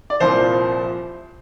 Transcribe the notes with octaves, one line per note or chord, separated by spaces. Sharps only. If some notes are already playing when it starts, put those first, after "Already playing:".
D5
C2 A#2 F3 C5